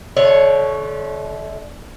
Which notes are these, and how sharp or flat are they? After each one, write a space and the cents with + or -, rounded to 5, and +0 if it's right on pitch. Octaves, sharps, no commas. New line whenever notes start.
D3 +0 A3 -35 C#5 +0